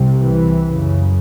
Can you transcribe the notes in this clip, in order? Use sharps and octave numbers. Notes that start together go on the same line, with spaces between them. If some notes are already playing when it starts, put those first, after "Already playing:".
Already playing: C2 C3
E3
F#2 C#3